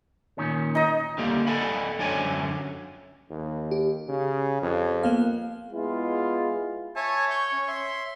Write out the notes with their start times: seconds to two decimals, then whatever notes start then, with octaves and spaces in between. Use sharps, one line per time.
0.38 A#2 D#3 C#4
0.75 D#4 D#5
1.18 D3 G3 A#3 G4
1.47 A4 D5 D#5 F#5 G#5 B5
1.99 F#2 D3 D4 C#5 G5 G#5
3.31 D#2
3.71 G4
4.09 C#3
4.62 F2
5.03 A#3 B3 F5
5.72 G#3 B3 E4 F4
6.96 C#5 E5 G#5 A5
7.30 C#6 G6
7.53 C#4
7.68 E5 C6